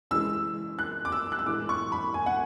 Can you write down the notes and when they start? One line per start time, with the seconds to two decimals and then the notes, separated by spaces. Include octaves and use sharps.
0.11 C#3 E3 G#3 E6
0.79 F#6
1.05 D6
1.12 E6
1.32 F#6
1.39 E6
1.46 A2 E3 G#3 D6
1.69 C#6
1.92 B5
2.14 G#5
2.26 F#5